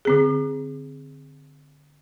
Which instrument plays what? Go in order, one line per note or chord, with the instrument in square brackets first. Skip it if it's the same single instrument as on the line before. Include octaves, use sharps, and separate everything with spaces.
[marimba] D3 C4 G#4